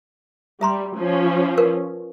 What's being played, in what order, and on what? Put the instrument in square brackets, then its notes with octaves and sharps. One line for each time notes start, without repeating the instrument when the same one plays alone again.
[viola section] G3 [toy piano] E5 A#5 C6
[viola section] F3 C#4
[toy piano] A#4 B4 F5